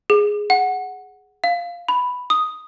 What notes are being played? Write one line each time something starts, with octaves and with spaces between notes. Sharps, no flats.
G#4
F#5
F5
B5
D#6